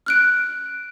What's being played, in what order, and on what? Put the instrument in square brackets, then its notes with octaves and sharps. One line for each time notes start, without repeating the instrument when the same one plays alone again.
[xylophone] F6 F#6 D7